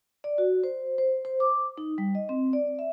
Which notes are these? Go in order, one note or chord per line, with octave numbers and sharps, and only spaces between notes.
D5
F#4
C5
C5
C5
D6
D#4
G3
D#5
C4
D5
E5